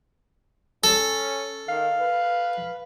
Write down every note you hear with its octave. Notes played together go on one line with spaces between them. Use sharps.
C#4 A4
D#3 F5
B4